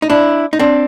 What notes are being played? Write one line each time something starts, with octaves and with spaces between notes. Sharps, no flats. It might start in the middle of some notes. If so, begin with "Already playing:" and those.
D#4
D4 E4
D#4
C4 D4